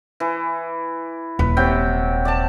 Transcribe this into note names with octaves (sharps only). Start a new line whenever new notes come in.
E3
D#1 B4
C3 F#3 G5
D5 A5